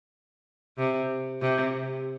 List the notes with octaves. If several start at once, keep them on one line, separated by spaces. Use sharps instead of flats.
C3
C3